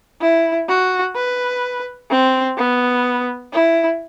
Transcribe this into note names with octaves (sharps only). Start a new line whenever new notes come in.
E4
F#4
B4
C4
B3
E4